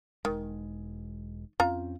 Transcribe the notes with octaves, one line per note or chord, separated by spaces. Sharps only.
E1 D#3 G#3
F2 C4 C#4 F4 A#5